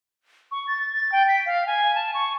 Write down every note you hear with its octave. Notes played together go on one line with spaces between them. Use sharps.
C#6
A6
A6
G5
B6
F5
G#5
A5
C#6